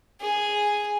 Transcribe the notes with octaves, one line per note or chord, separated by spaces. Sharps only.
G#4